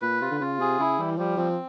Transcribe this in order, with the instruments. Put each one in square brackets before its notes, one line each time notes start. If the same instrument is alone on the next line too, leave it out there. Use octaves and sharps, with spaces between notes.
[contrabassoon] A#2 [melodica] B4
[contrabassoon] C3 [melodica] F4
[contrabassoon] D3
[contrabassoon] C#3 [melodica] F4
[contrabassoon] C3 [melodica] G#4
[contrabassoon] C#3 [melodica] E4
[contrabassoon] E3 [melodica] G3
[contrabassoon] F3 [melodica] G3
[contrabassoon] F3 [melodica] C4